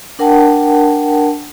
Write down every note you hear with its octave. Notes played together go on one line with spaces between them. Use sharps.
D4 A#4 F#5 G5 A5